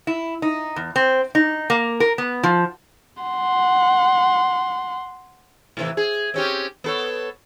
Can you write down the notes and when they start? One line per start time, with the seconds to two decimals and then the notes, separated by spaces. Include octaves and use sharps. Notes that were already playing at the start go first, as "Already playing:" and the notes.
0.07 E4
0.42 D#4
0.76 E2
0.96 C4
1.35 D#4
1.70 A#3
2.00 A#4
2.18 B3
2.43 F3
3.23 F#5 C6
5.77 A2 C3 E3
5.97 G#4
6.34 C4 C#4 G4
6.84 B3 A4 C#5